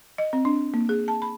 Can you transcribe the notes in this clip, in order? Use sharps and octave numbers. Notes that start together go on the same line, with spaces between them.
D#5
C4
D4
A#3
G#4
A5
B5